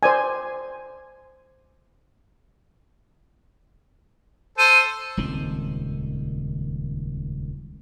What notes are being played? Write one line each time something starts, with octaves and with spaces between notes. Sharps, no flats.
C5 D5 G#5
A4 C5 D#7
D#1 C#2 D#3 C4